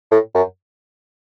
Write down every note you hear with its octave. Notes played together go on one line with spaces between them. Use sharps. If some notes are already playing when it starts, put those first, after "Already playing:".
A2
F#2